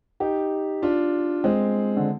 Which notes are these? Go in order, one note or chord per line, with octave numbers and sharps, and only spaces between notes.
D#4 G4
D4 F4
G#3 C4
D3